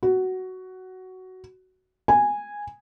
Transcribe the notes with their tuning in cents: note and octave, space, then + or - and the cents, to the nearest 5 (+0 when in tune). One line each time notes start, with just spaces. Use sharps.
F#4 +10
G#5 -10